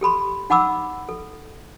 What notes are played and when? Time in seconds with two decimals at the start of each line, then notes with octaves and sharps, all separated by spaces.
0.01 G4 A4 B5 C6
0.50 D#4 F#5 B5 D6 E6
1.09 A4